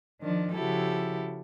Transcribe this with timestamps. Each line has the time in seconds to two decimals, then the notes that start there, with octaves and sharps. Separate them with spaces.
0.21 D#3 F3 D4
0.53 C#3 F3 E4 F#4 G4 A4